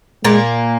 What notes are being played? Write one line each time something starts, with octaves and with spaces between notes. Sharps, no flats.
A#2 G#3 A#3